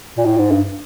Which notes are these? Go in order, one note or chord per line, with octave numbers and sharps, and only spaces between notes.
A#2
A2
G#2
G2